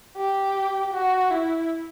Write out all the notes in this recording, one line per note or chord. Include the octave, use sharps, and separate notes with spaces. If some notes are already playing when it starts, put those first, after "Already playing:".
G4
F#4
E4